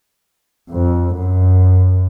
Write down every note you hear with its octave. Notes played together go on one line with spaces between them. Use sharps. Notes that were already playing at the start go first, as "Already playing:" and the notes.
F2
F#2